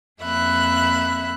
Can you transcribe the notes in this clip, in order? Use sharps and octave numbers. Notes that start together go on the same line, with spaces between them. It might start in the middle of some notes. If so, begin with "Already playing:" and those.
F2 A#3 E5 B5 F#6